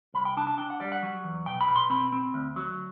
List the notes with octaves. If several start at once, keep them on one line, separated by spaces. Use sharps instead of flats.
C2 B5
G5
D4 A5
A5
D4 G5
F#5
G3 D5
F#5
F#3
E2
B2 G5
B5
B2
C6
C4 B5
C4
D2
F#3